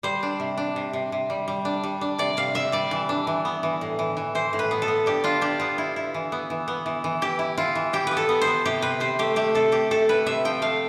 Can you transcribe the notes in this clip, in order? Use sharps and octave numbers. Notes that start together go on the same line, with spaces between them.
G3 C5
D4
C3
D4
C3
C3
C3
G3
G3
D4
G3
D4
C3 D5
C3 F5
C3 E5
G3 D5
E3
D4
E3
B3
E3
A2
E3
E3
E3 C5
A2
B4
B3
A4
B3
D4 G4
D4 F4
D4 G4
B3 F4
E4
E4
E3
B3
E3
B3
E3
E3
E4 G4
E4
E4 F4
E3
E4 G4
B3 B4
A4
B3
C5
B3
C3 G4
C3 B4
C3 C5
A3 G4
A3 G4
C3 A4
C3 G4
A3 A4
E4 B4
C3 E5
F3 G5
A3 F5